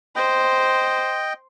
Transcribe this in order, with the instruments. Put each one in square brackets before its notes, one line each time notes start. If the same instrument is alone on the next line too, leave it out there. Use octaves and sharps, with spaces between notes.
[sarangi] C5 [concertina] D#5 G5